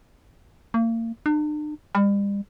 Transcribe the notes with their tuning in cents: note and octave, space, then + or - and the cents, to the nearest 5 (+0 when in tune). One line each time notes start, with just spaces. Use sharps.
A#3 -35
D4 +45
G3 +40